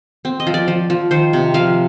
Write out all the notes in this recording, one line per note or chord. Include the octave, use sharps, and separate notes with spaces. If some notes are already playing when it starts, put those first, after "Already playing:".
C4
D#5
F3
D5
F3
F3
D#3 C5
C3
F3 F5